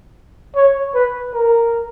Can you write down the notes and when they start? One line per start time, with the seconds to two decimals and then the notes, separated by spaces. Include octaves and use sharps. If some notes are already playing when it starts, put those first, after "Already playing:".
0.56 C#5
0.95 B4
1.34 A#4